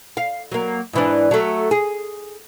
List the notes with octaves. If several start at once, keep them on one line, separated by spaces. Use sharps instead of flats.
F5
F#3 A#3
G#2 E3 D4
F#3 A3
G#4